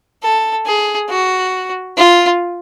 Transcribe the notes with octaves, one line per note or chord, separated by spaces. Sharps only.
A4
G#4
F#4
F4